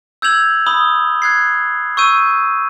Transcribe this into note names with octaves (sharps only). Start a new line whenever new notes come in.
E6 G6 G#6 F7 F#7
B5 D#6 F#7 G7
F#6 G#6 C7
C#6 E6 G6 D#7